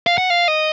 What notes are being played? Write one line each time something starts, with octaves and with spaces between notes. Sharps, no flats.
F5
F#5
F5
D#5